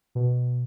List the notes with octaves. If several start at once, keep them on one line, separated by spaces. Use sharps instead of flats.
B2